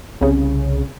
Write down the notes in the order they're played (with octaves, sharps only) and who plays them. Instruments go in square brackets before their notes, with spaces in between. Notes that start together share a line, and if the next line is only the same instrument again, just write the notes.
[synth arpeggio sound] C2 C#3